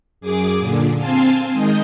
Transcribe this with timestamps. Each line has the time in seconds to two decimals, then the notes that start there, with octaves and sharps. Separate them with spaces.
0.21 F#2 G#4 D6
0.58 A#2 D3
0.98 C4 C5 F5 G#5 A5
1.52 D#3 G#3 D#5 G6